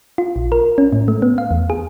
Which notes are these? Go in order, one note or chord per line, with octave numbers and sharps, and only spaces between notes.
F4
A#1
A#4
C#4
A2
A3
B3
F5
E2
G#4